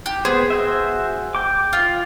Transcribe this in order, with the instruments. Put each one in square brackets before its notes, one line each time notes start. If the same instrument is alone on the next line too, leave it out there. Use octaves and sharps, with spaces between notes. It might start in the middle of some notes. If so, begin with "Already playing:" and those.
[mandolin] G4
[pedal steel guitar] B3 C5 [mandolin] G#4
[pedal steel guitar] F#4 C5 E5
G5 D6
[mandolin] F4